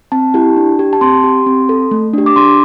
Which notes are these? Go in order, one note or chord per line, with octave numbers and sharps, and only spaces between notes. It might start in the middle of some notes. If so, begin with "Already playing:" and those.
C4 A5
E4 G4
D4
G4
A5
C4 C6
G4
C4
A4
A3
D4 G4
D6
D4 C6